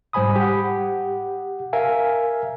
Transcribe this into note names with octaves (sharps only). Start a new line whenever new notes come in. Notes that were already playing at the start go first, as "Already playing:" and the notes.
G#2 G3 C5 G#5 B5 D#6
G4 F#5
A#4 E5 F5 G#5